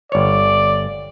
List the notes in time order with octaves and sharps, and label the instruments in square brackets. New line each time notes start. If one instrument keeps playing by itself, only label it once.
[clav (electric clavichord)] G1 C#5 [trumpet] D5